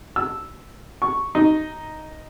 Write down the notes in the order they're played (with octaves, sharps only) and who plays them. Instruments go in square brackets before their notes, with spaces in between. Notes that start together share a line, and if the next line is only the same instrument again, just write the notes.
[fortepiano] E6
C#6
D#4